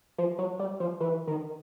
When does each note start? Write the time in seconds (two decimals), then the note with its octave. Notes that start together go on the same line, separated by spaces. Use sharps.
0.18 F3
0.38 F#3
0.59 G3
0.80 F3
1.00 E3
1.27 D#3